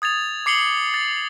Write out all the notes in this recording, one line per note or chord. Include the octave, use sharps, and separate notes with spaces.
D#6 G#6 A6 F7
D6 C7 C#7 F#7 G7
A6